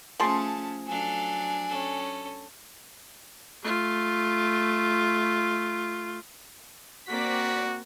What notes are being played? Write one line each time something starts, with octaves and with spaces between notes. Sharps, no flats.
F3 A3 C#4 G#4 A5 C6
F#3 D4 A4 F5 G#5
C#4 A4
A3 F4
A#3 C4 F#4 D5 B6